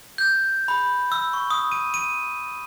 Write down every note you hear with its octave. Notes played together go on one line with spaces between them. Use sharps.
G6
B5
E6
C#6
D#6
D#7
D#7